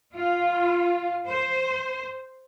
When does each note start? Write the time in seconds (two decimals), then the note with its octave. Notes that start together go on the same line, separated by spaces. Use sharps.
0.14 F4
1.27 C5